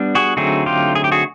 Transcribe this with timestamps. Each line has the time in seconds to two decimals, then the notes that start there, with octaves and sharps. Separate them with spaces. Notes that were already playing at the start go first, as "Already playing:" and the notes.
Already playing: G3 B3 D4
0.15 F#4 G#4
0.37 D3 F#3 A3 C4 D#4 F#4 G#4
0.66 F4 G4
0.95 G#4
1.04 G4
1.12 F#4 G#4